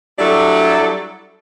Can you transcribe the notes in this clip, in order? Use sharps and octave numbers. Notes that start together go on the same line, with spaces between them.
F#3 G3 A3 D4 E4 A4